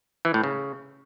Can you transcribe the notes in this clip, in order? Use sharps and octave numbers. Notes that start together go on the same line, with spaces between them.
E3
A2
C#3